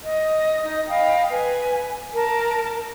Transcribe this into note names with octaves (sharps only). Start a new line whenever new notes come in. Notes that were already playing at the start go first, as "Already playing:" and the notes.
D#5
D#4 D#5
D#5 F5 G5 B5
B4 G#5
A#4 A5